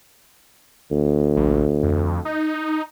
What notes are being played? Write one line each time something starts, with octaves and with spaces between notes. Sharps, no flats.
D2
A#1
F2
D#4